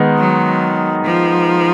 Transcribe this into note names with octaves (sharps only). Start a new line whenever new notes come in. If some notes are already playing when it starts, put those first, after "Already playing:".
Already playing: D#3 G#3 B3 D#4
F#3
F3